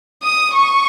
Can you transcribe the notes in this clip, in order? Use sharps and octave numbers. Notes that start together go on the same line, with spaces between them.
D#6
C#6